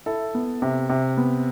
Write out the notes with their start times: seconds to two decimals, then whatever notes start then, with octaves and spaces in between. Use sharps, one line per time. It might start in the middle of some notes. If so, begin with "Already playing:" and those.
0.06 E4 A4
0.34 B3
0.62 C3
0.89 C3
1.17 B3